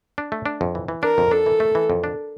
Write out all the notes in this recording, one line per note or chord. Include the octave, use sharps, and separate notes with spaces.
D4
A3
D4
F2
E3
E3
D4 A#4
F2
D4 A4
E3
A3
E3
F2
D4